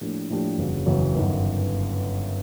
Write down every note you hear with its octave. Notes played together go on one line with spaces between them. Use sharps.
A2 F3 A#3 D4 G4
A2 F3 A#3 D4 G4
F#1 E2 C#3 F#3
F#1 E2 C#3 F#3
G1 F#2 D#3